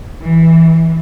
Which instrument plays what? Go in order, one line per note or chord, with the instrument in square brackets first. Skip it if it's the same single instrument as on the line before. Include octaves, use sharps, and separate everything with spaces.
[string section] E3